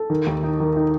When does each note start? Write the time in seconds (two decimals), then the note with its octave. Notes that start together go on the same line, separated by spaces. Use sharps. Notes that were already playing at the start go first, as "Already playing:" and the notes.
Already playing: A4
0.10 D#3
0.27 D#2
0.43 D#4
0.60 D#3
0.76 D#4